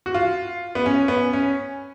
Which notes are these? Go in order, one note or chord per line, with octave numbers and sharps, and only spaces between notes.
F#4
F4
B3
C#4
B3
C#4